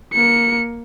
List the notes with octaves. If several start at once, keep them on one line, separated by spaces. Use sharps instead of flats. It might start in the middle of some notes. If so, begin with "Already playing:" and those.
A#3 C#7